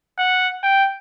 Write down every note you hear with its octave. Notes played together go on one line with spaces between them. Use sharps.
F#5
G5